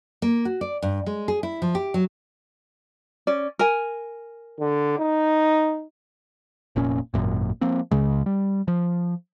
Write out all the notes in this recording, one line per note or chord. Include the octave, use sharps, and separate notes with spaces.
A#3
F#4
D5
G2
G#3
G#4
E4
F3
G4
F#3
C#4 D5
A#4 G#5
D3
D#4
F1 A#2 C#4
G#1 F#2 A#2
F3 A#3 C4
C#2 C#3 G#3
G3
F3